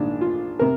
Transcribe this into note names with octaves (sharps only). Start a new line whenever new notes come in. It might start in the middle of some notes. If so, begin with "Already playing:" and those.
Already playing: A#1 G#2 D#3 D4
F4
C3 A#4